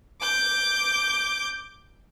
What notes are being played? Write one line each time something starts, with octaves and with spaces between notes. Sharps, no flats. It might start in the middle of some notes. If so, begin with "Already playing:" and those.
D6 G6